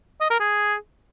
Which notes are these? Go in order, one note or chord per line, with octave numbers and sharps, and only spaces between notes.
D#5
A#4
G#4